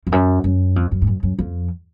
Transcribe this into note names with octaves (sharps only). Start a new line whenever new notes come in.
F2
F#2
F#2
F2
F#2
G#2
F#2
F#2
F2